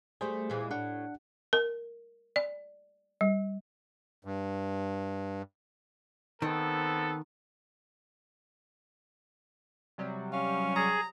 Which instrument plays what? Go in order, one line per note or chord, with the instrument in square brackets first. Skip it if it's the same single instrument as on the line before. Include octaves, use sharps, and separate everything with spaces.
[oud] G3 A3 [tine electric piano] G#4 C5
[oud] A#2 E3 G#3
[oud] A2 [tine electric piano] D4 F#5
[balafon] A#4
D5
G3
[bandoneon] G2
[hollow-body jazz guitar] D#3 [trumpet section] B3 C4 A4
[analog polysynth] C3 F#3 G3
[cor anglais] C#4 [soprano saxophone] F5
[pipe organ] G#4 [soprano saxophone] A#5